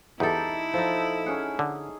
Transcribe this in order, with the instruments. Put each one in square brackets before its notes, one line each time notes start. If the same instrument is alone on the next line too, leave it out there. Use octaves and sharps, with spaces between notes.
[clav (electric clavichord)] E2 [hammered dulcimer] D#4 [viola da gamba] E4 [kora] G4 A4
[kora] F3 D#4 [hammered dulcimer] A4
[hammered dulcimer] C#4 G#4 [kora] F#5
[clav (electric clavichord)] D3